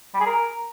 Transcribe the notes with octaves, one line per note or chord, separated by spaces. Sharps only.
G3
G#4
A#4